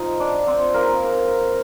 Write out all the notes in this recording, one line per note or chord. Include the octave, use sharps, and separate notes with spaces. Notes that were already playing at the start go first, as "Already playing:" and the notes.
Already playing: F3 C4 D#4 F4 D#5
D4 D5
C4 C5
G#3 A#3 C4 D#4 A#4